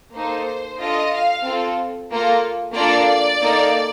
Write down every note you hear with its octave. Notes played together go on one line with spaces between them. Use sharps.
A#3 D#4 A4 C5
D4 F4 A4 D#5
F5
C4 F4 A4
A#3 F4 A4
A#3 D4 F4 A4 D5
A#3 D#4 A4